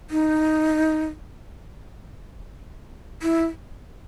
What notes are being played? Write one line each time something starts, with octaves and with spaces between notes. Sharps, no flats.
D#4
E4